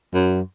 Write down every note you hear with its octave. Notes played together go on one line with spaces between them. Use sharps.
F#2